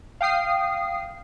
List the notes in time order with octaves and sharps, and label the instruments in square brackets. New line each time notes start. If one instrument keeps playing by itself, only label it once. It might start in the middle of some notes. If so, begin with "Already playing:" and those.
[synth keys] F5 G5 D#6 C7